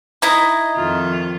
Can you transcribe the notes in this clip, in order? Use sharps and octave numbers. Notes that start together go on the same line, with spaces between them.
D#4 E4 D#5
F2 D#3 F4